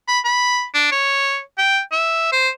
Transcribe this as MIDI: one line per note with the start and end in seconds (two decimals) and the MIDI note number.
0.08 0.20 83
0.25 0.65 83
0.74 0.88 62
0.92 1.40 73
1.58 1.80 79
1.92 2.29 76
2.32 2.49 72